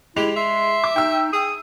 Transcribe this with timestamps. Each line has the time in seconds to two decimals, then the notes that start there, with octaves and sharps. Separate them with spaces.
0.16 G#3 E4 G4 F7
0.36 E5 C6
0.84 D6
0.96 D#4 G5 E6
1.33 G#4 D#6